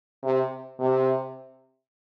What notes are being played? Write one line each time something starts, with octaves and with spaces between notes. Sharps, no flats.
C3
C3